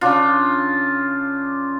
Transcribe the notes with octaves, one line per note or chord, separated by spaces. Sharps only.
C#3 D4 F4